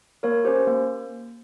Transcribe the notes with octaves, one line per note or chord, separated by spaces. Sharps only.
A#3 A#4 C#5
C#4 G4 C5
A#3